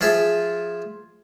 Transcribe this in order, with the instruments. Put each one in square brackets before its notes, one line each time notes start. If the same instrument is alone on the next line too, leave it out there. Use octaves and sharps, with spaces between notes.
[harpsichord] F3 F4 G#4 E5